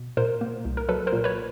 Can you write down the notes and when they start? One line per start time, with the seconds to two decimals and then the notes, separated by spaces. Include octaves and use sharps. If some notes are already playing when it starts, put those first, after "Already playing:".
Already playing: B2
0.17 A#2 A#4 C5
0.41 A#3
0.65 C2
0.77 A#4
0.89 F#3 A4 B4
1.07 A#4 C5
1.13 A#2
1.24 B4 C#5